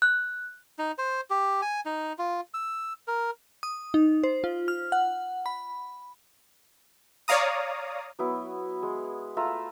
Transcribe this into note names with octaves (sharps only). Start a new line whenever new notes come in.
F#6
D#4
C5
G4
G#5
D#4
F4
E6
A#4
D#6
D#4
C5
F4
F6
F#5
B5
C#5 D5 F5 A#5 D#6
F#3 B3 E4
G#3
A3 F4 E5 A#5